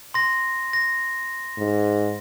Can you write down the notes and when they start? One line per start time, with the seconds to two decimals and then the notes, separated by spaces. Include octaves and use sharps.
0.14 C6 A#6
0.73 A#6
1.58 G#2